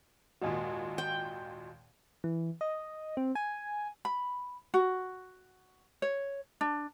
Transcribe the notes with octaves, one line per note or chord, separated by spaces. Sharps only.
G#1 D#2 A#2 F#4 D#5 G#5
G5
E3
D#5
C4
G#5
B5
F#4
C#5
D4